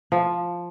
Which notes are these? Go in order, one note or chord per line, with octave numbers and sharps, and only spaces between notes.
F3